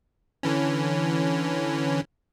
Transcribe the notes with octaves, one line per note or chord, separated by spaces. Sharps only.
D3 E3 C#4